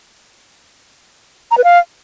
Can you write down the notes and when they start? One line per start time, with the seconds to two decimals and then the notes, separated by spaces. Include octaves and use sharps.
1.51 A#5
1.58 B4
1.64 F5